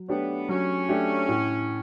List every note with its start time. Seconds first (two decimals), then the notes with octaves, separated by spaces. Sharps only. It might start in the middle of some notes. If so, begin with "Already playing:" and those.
Already playing: F#3
0.09 A3 B3 D4 G4 C#5
0.49 F#3 C#4
0.89 A3 D4 G4 C#5
1.29 A2